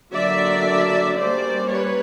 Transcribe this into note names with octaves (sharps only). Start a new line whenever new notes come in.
D3 F#3 A#3 D4 D5 E5
G3 A#3 C#4 C5 D5
B4 C#5